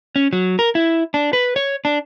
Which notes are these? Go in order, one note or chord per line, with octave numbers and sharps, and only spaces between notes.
C#4
F#3
A#4
E4
D4
B4
C#5
D4